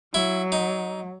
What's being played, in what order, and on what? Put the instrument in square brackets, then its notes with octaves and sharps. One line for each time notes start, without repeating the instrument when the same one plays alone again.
[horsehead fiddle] F#3 [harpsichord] E4
[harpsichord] D#4